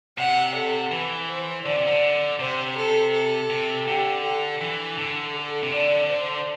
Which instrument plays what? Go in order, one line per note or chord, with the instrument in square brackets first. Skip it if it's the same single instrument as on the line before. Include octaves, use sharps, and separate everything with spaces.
[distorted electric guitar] C3 [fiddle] F#5
[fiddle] A4
[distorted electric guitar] E3 [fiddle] B4
[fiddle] C5
[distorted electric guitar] D3 [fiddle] D5
[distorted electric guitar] C3
D3
[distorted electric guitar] C3 [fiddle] C5
[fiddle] A4
A4
[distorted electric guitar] C3
[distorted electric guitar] D3 [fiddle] G4
[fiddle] A4
[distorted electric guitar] E3
D3
[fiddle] A4
[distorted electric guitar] C3
[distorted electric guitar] D3 [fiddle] D5
[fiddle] C5